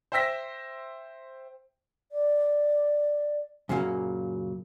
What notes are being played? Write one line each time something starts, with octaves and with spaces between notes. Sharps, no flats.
C5 E5 G5 E6 A#6 B6
D5
F#2 A#2 C#3 F#3 G#3 A#3